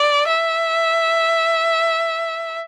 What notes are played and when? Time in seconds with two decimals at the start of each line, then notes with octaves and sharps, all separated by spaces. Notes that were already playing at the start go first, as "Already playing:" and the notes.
Already playing: D5
0.27 E5